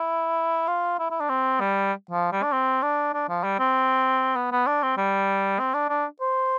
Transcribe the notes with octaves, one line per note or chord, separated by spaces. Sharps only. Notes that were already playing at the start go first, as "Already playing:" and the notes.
Already playing: E4
F4
E4
E4
D4
C4
G3
F3
G3
D4
C4
D4
D4
F3
G3
C4
B3
B3
D4
C4
G3
C4
D4
D4
C5